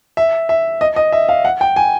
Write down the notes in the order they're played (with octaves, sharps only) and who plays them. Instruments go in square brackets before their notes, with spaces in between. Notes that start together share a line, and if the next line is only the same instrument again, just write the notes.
[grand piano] E5
E5
D#5
D#5
E5
F5
F#5
G5
G#5